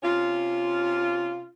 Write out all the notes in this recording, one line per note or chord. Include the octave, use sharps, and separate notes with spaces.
C3 C#4 F4